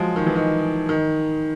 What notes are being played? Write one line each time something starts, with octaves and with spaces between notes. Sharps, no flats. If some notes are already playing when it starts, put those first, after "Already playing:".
Already playing: F3 F#3 G#3
D#3
E3
D#3
D#3